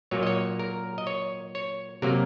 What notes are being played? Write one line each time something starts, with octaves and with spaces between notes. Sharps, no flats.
A#2 F#3 A#3 C#5
D#5
C#5
A#4
D#5
C#5
C#5
C3 F#3 A#3 A#4